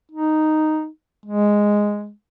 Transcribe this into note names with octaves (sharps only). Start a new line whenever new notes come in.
D#4
G#3